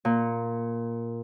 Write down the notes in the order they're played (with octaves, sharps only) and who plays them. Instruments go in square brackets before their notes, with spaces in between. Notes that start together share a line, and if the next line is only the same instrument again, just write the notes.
[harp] A#2